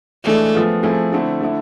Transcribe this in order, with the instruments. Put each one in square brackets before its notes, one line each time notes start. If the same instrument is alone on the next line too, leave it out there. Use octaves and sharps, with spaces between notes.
[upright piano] E3 G#3 D4 G#4 [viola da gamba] A3
[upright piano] F3 B3 F4 G#4
F3 A3 C4 E4 G#4
D3 A3 C4 E4
D3 A3 E4